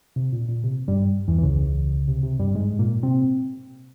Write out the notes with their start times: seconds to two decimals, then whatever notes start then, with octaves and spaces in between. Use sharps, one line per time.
0.16 C3
0.33 A#2
0.48 A#2
0.64 C3
0.88 G2 G3
1.28 E2 E3
1.38 E3
1.43 C#2 C#3
2.08 C3
2.23 C3
2.39 G2 G3
2.55 G#2 G#3
2.79 A#2 A#3
3.03 C3 C4